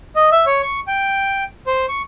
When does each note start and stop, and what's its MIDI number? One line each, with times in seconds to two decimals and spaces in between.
0.16 0.30 75
0.32 0.45 76
0.46 0.62 73
0.62 0.80 85
0.88 1.44 79
1.67 1.86 72
1.89 2.02 85